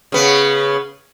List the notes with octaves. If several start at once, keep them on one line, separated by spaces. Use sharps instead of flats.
C#3 B3